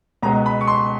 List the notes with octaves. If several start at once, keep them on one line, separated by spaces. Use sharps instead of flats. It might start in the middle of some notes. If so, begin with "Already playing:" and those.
C#2 B2 G#3 B3 A#5
B5
C#6
C6